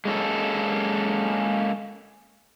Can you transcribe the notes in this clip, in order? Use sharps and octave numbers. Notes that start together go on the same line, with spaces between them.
G#3 A#3 C#4 E4 A4